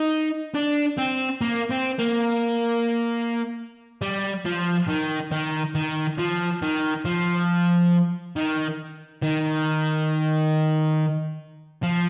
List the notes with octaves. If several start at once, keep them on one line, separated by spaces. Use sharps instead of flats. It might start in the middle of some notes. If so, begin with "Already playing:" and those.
Already playing: D#4
D4
C4
A#3
C4
A#3
G3
F3
D#3
D#3
D#3
F3
D#3
F3
D#3
D#3
F3